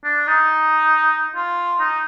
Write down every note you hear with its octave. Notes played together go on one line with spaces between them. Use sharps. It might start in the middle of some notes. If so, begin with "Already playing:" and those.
D4
D#4
F4
D#4